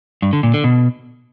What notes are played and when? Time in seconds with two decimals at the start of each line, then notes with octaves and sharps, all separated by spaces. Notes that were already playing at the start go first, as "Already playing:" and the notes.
0.22 G2
0.33 D3
0.43 A#2
0.54 D3
0.64 B2